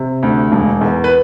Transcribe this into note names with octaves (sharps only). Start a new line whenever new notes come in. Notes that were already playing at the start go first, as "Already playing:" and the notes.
Already playing: C3
D2
E1
E2
B4